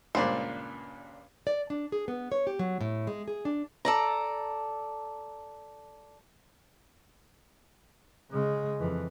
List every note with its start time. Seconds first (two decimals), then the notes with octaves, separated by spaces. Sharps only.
0.15 C#2 G2 A#2 C5 D5
1.47 D5
1.70 D4
1.92 G#4
2.08 B3
2.32 C#5
2.47 G4
2.59 F#3
2.81 A2
3.07 G#3
3.28 G#4
3.45 D4
3.85 A4 D5 A#5
8.31 C#3 G#3
8.80 F2 E3